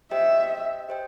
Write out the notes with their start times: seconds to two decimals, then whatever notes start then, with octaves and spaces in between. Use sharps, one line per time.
0.11 G4 C5 D#5 E5 G5
0.89 G4 C5 D#5 G5